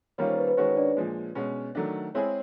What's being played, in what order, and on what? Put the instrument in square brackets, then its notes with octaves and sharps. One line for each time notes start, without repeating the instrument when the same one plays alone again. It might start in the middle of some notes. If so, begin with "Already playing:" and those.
[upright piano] D#3 G3 A#3 C#4 F4 [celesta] C#5
[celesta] C5
B4
B4
[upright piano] D#3 G#3 C#4 F#4 [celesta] C#5
[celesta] D4 D5
[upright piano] A#2 F3 G#3
B2 G#3 C#4
D#3 F#3 A3 D4
[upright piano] G#3 C4 E4 G#4 [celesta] C#5